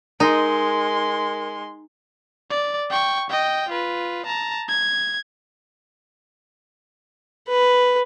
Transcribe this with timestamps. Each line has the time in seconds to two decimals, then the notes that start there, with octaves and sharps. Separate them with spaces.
0.20 G#3 D#4 A#4 C6
2.50 D5
2.90 G5 C#6
3.30 D#5 G5
3.69 F4 B4
4.26 A5 A#5
4.68 G#6
7.48 B4